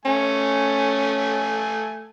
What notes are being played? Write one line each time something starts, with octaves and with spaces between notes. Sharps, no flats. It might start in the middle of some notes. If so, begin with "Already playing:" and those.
A3 C#4 G#5